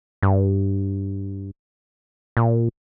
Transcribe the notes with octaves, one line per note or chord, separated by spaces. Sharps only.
G2
A#2